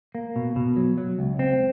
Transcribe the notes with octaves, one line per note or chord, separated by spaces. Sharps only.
A#3
B2
B2
F#3
F#3
C#2
C4